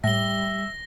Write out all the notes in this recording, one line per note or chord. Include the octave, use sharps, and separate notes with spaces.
A2 G3 E5 A#6 G7